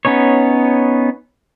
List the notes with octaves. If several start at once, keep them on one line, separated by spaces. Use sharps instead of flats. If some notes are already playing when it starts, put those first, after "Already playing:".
B3 C#4 D#4 C#5